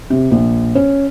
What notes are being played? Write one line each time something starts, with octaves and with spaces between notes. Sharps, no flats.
C3
A#1
C#4